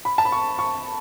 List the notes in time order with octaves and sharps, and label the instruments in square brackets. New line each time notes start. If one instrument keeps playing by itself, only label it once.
[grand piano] B5
A5
B5
C#6
C#6